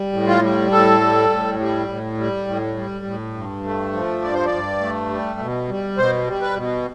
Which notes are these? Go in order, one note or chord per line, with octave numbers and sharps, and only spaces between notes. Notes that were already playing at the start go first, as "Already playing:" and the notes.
Already playing: G3
A2
F4
G3
A2 A4
G3
A2
G3
A2
G3
A2
G3
A2
G2
A3
F3
G2 D5
C5
D5
G2
A3
G3
B2
G3
B2 C5
G3
B4
B2